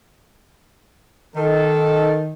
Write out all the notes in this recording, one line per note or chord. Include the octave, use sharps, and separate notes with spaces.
D#3 D#4 A4